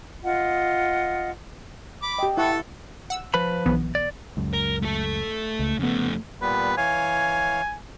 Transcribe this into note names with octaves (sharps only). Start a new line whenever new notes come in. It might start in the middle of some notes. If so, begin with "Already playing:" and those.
F4 D#5 F#5
B5 D6
G4 D#5 G5
E4 A4 F#5 C#6
F#5 E6
F3 B4 B5
B1 E3 B3
D5
C#2 F#2
A#4
A3 A4
C#2
F2 C#3 A3 B3
A#2 G3 B3 B4
E3 C#5 F5 G#5